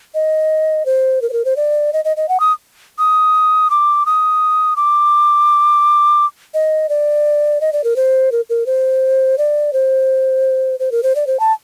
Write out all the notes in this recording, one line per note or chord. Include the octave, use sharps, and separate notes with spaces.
D#5
C5
A#4
C5
A#4
C5
D5
D#5
D#5
D#5
F#5
D#6
D#6
D6
D#6
D6
D#5
D5
D#5
D5
A#4
C5
A#4
A#4
C5
D5
C5
C5
A#4
C5
D5
C5
A5